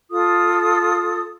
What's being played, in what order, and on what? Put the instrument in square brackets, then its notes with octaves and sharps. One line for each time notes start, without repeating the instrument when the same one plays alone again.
[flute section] F4 A4 D#6